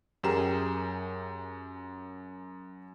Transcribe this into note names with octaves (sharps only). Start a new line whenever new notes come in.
F#2 G4 G#4 A#4 E7